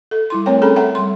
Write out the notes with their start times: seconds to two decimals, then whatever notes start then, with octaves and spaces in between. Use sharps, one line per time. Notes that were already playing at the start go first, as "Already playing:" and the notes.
0.11 A4
0.30 G3 E4 C6
0.46 A3 C4 A#4 C#5 G5
0.62 C#4 G#4 A4 G5 A#5 B5
0.76 A4 E5 F#5 G5 A#5
0.95 G3 C6